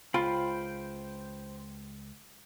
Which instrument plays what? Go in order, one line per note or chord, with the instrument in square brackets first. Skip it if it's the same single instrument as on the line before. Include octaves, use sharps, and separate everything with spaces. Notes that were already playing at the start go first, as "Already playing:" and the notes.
[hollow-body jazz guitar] C#2 [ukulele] F4 [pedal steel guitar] C5 G5 B5